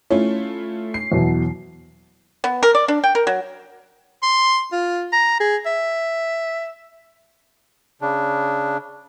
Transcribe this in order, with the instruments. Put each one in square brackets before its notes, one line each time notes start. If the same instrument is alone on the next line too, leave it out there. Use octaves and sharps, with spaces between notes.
[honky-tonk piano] A3 E4 F4 [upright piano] C#4
[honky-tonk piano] C7
[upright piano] E2 B2 F#3
[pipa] B3
A#4
D5
D4
G5
A#4
F#3
[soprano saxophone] C6
F4
A#5
G#4
E5
[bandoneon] C#3 D4